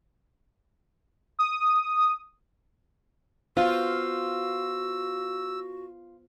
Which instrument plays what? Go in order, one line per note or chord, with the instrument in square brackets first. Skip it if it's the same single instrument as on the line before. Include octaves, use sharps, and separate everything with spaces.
[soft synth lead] D#6
[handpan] B3 C5 F5 [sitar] F4 [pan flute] F#4 [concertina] E6